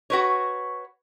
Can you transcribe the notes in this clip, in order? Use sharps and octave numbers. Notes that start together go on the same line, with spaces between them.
F#4 B4 C#5